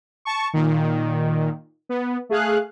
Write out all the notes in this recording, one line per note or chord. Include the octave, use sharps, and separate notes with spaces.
A5 C#6
A#2 D#3
B3
A3 G#4 F5 F#6